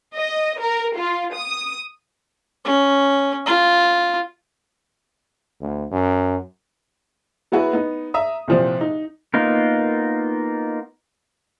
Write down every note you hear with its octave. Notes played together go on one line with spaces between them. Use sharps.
D#5
A#4
F4
D#6
C#4
F4
D2
F#2
F#3 B3 E4 F#4 G#4 B4
B3 D#4
E5 A#5 D#6
C2 A#2 F3 C4 C5
D#4
A#3 B3 D#4 F4 A#4